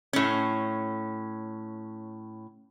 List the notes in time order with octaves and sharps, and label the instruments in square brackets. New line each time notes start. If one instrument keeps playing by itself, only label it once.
[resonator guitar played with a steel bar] A2 C#4